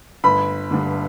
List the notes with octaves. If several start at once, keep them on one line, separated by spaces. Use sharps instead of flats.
G1 B5
G2 D3